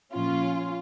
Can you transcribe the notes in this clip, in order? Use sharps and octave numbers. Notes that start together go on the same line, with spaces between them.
A#2 F3 C#4 F4